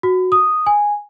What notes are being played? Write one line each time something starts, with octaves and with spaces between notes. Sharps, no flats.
F#4
D#6
G#5